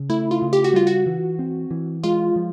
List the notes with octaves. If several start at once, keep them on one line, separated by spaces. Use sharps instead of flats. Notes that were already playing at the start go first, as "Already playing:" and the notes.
Already playing: C#3
A3 E4
F4
C#3
G4
F#4
G3 F4
F#4
E3
C4
E3
G#3 F4
F3